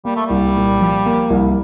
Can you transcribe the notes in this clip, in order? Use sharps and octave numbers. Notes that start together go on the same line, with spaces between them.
G3 A#3
A3
C2 G3
A#2
F3
A#3
C2